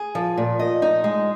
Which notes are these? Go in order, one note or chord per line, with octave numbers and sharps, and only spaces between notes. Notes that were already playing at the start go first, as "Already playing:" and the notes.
Already playing: G#4
F3
A#2
D#5
D#4
G#3